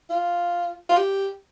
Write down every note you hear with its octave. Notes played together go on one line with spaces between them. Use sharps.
F4
F4
G4